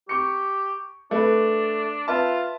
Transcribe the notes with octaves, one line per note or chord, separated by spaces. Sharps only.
G4 C#6 C#7
A3 D4 B4
F4 B4 E5 A5